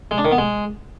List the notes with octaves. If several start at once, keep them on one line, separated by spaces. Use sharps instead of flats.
G#3
D4
D#3
B3
G#3